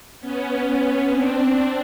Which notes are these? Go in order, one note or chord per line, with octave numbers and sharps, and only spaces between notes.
B3 C#4
C4 D4